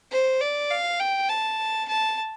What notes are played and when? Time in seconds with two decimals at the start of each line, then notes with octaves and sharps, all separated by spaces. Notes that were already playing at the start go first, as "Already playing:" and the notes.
0.11 C5
0.41 D5
0.70 F5
1.00 G5
1.29 A5
1.88 A5